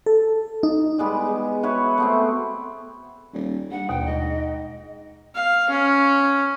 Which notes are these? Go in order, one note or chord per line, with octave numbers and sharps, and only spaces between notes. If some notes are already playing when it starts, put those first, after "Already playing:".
A4
D#4
G3 G#3 B3 G4
G#3
E4 F#4 B4 C#5
A3 B3 C4
D#1
G2 F#5
A#1 D#2 B2 G5
G#2 D#5
F5
C#4